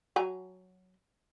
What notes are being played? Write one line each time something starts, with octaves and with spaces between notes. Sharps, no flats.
F#3 G#5 A#5